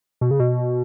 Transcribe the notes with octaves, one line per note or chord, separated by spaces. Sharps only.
B2
C#3
B2